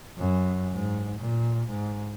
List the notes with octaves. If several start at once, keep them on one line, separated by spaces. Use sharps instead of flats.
F#2
G#2
A#2
G#2